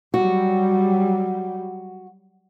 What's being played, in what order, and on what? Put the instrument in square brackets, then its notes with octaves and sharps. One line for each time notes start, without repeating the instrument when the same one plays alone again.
[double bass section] F#3 G3 [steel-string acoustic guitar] F#4